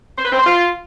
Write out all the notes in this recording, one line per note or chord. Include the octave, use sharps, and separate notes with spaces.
C5
B4
C4
C5
F4